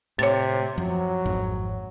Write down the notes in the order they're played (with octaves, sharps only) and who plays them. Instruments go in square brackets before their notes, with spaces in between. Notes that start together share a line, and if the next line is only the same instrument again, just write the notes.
[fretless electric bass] A2 [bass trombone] C3 [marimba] C#5 A6
[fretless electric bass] F#2 F3 [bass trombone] F#3
[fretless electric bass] G#1 F2 G#2